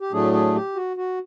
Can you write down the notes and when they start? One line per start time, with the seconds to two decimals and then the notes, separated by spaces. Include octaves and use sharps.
0.01 G4
0.12 A2 F#3 A3 D4 G#4
0.33 G#4
0.55 G4
0.75 F#4
0.97 F#4